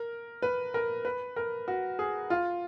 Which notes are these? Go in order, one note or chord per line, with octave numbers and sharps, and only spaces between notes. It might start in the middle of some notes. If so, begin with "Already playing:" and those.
Already playing: A#4
B4
A#4
B4
A#4
F#4
G#4
F4